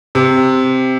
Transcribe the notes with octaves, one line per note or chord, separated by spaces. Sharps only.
C3